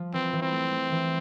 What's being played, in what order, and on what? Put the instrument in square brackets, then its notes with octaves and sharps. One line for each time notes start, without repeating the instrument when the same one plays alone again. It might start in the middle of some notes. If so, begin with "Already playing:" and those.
Already playing: [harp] F3
[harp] E3 [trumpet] C4
[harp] E3
[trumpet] C4
[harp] A3
A3
E3